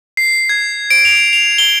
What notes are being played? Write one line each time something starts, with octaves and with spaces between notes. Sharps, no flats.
C7
G#6
D7
F7
F7
G7